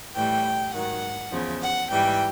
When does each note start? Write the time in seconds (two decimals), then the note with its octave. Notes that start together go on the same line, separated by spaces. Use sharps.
0.15 A2 E3 G3 G5
0.74 G#2 D#3 F#3 F#5
1.32 E2 C#3 F3
1.61 F#5
1.91 G#2 E3 G3 G5